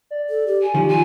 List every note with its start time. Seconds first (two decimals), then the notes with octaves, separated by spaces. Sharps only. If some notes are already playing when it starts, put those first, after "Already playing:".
0.11 D5
0.29 A4
0.47 G4
0.62 G#5
0.75 D#3 F3 C#4 G4
0.88 F4 G#5